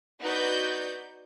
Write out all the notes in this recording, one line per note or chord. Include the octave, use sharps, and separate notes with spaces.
B3 D#4 F#4 B4 D5 G6